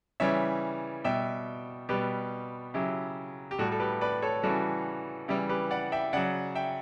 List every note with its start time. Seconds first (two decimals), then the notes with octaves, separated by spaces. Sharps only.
0.20 C#3 E3 G3 C#5 E5
1.04 B2 G3 E5 G5
1.89 B2 G3 G4 B4
2.74 C#3 F#3 E4 G4
3.51 G4
3.59 A2 G3 F#4 A4
3.72 A4
3.80 G4 B4
4.01 B4 D5
4.22 A4 C#5
4.43 C#3 E3 G3 F#4 A4
5.28 C#3 E3 G3 E4 G4
5.49 G4 B4
5.71 D5 F#5
5.92 E5 G5
6.13 C#3 F#3 D5 F#5
6.55 E5 G5